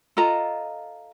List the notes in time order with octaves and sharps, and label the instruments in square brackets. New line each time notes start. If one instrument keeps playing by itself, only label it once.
[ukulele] F4 A4 D#5 A#5